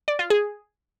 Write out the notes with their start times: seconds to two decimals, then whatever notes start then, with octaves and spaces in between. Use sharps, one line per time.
0.08 D5
0.19 F4
0.30 G#4